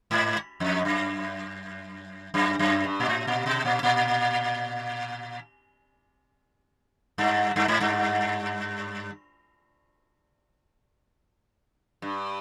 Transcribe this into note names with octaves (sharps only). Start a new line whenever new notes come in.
G#2
F2
F#2
F#2
F#2
G2
A#2
A2
A#2
B2
A#2
A#2
G2
G2
G#2
G2
G2